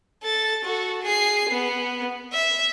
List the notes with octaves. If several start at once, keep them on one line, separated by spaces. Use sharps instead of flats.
A4 A6
F#4 A4
G#4 C7
B3
E5